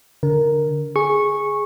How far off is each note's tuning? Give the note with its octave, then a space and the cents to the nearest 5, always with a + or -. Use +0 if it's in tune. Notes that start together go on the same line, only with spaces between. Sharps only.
D3 -30 A#4 +0
G#4 +0 C#6 -10